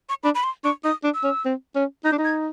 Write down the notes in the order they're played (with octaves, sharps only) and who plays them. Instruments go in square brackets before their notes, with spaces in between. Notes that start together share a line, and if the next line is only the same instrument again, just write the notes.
[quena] C#6
[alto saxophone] D4 [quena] B5
[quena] B5
C6
[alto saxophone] D4 [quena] C#6
[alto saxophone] D#4 [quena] D#6
[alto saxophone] D4
[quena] E6
[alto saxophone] C#4
C4
C#4
[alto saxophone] D#4 [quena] G6
[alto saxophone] D4
D#4
[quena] G#6